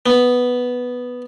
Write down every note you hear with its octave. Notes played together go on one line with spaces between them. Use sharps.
B3